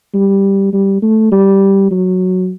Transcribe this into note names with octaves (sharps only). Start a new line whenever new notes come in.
G3
G3
A3
G3
F#3